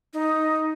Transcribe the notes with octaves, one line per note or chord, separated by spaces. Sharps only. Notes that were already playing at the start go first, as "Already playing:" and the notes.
D#4